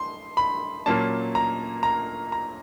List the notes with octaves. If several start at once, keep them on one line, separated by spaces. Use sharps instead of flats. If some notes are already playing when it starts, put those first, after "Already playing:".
Already playing: C6
B5
A#2 F#3 A#3 C#4 A5
A#5
A#5
A#5